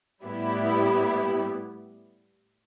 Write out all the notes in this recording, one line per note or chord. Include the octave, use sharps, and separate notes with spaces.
A2 G3 B3 E4 G4